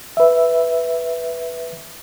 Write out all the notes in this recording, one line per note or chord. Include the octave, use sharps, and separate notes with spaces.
B4 E5